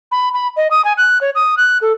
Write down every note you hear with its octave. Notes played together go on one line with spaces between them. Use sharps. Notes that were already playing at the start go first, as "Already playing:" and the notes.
B5
B5
D#5
D#6
G#5
F#6
C#5
D#6
F#6
A4